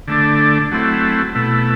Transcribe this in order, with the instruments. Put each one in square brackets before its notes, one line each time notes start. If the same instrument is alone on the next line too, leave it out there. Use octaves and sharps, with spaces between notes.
[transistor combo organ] D3 A3 D4
F#3 A3 C4 E4
B2 A3 E4